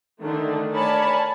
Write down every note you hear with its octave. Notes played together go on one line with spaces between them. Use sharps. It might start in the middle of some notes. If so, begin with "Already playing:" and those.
D3 D#3 A3 D4
A#4 C#5 D5 G#5 A5 B5